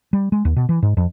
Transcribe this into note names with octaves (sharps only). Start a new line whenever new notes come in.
G3
G#3
D#2
B2
E3
G#2
F2